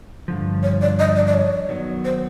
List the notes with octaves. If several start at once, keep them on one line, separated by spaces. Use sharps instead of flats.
G2 D3 F3
C#5
D5
D#5
D5
D5
C#5
D#3 F#3 B3
C5